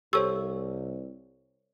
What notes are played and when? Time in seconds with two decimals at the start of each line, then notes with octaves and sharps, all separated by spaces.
0.13 C2 G4 A4 C5 C#5 C#6 E6